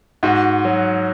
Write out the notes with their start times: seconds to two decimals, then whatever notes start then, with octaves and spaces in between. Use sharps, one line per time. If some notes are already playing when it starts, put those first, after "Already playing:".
0.23 G#2 F#4
0.65 F#3